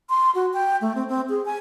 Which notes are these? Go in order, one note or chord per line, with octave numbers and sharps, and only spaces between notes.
C6
F#4
G5
A3
C4
C4
G#4
G#5